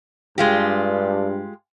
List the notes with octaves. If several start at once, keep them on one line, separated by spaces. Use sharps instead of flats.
G2 G#3 F4 G4